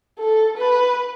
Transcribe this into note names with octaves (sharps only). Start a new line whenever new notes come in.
A4
B4